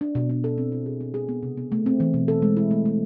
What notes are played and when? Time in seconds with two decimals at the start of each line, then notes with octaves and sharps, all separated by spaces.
0.01 D4
0.15 B2
0.30 D4
0.44 A4
0.58 C4
0.72 E4
0.86 G#4
1.01 C4
1.14 G#4
1.29 B3
1.43 C3
1.57 B3
1.72 A3
1.86 C4
2.00 E3
2.14 B2
2.28 A4
2.42 G#3
2.57 E4
2.71 A3
2.85 A3